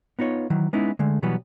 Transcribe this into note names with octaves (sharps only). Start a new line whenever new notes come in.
B3 D#4 F4 C#5
D#3 E3 F#3
G#3 B3 C#4 D#4 E4
D3 G#3 A3
B2 E3 F#3 G3 B3